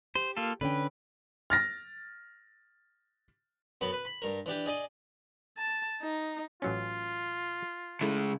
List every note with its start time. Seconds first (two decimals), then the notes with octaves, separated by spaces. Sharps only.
0.15 G4 C5
0.37 A#3 F4 A4
0.61 D3 C#4 B4 G5
1.50 F6 A6 A#6
3.81 F#2 B3 B5
3.92 B4
4.05 B5
4.22 G2 A#4
4.46 E3 D4 G4
4.66 G#4 D5 D#5
5.57 A5
6.02 D#4
6.62 A1 F#3 C#4 F4
8.01 C#3 G#3 A3 E4